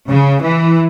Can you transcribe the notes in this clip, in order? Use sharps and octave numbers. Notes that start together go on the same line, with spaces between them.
C#3
E3